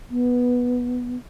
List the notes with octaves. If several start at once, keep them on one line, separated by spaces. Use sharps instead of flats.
B3